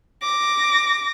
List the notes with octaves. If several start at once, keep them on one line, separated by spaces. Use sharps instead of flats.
D6 A#6